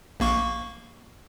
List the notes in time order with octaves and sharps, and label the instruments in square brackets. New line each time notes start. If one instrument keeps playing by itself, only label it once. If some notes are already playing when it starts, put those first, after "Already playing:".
[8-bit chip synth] A#1 A#3 C#6